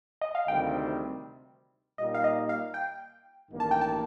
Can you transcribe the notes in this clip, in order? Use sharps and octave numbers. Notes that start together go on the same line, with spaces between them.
D#5
F5
D2 C3 D#3 G3 C4 G5
A#2 G3 A#3 D#4 D#5
F5
D#5
F5
G5
A1 G2 D#3 A#3
A5
G5
A5